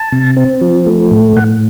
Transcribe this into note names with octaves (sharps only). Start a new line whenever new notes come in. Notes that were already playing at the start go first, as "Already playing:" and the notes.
Already playing: A5
C3
C4
F3
A3
A2
A2 F#5